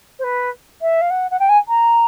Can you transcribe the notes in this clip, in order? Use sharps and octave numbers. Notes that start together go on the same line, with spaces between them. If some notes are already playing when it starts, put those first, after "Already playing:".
C5
B4
E5
F5
F#5
F#5
G5
G#5
A#5